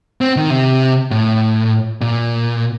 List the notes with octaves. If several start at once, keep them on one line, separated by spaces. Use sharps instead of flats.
C4
D#3
C3
A2
A#2